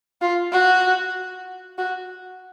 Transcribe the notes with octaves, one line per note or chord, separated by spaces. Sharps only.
F4
F#4
F#4